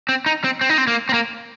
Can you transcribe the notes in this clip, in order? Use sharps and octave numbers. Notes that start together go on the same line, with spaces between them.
C4
D#4
C4
C4
D#4
C4
A#3
C4
A#3